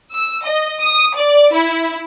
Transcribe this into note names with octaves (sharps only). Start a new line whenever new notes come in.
E6
D#5
D#6
D5
E4